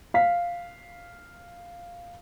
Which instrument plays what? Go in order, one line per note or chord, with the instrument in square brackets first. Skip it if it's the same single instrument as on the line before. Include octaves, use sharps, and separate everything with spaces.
[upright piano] F5 B6